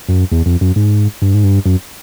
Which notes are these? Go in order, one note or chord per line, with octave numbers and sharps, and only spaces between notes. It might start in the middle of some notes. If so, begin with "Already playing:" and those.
F#2
E2
F2
F#2
G#2
G2
G#2
G2
F#2